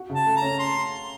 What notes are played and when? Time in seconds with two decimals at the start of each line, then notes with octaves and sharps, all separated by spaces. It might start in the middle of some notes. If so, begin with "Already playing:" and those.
Already playing: F#4
0.10 C#3
0.15 A5
0.26 A3
0.37 A#5
0.42 C#4
0.59 C6